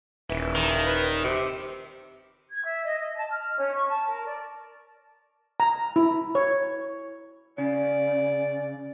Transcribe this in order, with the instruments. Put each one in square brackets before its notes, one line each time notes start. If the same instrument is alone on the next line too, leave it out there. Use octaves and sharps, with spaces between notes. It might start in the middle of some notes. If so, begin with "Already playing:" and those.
[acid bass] D#1 [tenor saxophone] E3
[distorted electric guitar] D#3
[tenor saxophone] B4
C3
[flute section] G#6
E5
D#5
D#5
A5
F6
C#4
C#6
A5
A#4
D5
[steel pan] A#5
E4
C#5
[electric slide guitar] C#3 [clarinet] D5